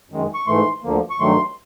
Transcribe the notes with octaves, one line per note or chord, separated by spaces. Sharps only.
F#2 D#3 G#3
C#6
G#2 E3 A3 C6
D2 D3 F3 A#3
C#6
G2 D#3 F#3 A3 C6